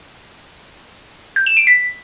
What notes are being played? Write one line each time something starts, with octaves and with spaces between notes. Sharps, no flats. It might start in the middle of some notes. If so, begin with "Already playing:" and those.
G6
E7
D7
B6